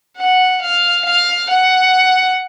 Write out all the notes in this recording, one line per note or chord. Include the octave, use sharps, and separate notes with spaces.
F#5
F5
F5
F#5